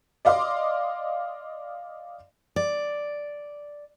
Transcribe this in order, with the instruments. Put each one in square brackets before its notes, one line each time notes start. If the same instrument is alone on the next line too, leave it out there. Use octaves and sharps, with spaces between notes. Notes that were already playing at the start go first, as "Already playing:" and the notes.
[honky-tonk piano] D5 D#5 F5 C6 D6
[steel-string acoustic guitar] D5